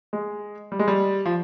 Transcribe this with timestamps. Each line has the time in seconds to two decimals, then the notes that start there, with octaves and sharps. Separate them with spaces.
0.13 G#3
0.72 G3
0.79 G#3
0.88 G3
1.26 F3